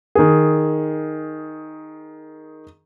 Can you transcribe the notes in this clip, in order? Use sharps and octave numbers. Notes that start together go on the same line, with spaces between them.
D#3 G#4